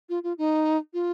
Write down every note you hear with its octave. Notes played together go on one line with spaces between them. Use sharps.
F4
F4
D#4
F4